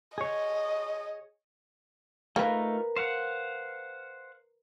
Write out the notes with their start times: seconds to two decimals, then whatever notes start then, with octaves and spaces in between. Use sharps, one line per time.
0.18 G#4 C#5 D#5
2.36 A3 A#3 D#4 F4 A#4 B4
2.96 C5 F5 F#5